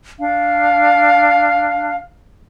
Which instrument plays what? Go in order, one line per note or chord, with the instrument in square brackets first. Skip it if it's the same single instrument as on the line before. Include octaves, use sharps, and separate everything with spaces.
[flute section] D4 F5